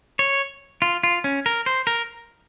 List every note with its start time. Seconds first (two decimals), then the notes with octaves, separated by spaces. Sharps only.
0.19 C#5
0.82 F4
1.03 F4
1.24 C#4
1.46 A#4
1.66 C5
1.87 A#4